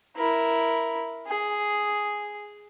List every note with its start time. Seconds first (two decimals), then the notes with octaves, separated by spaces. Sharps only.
0.16 E4 A#4
1.27 G#4